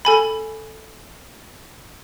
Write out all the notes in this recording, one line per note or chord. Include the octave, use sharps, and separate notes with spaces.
A4 G#5 B5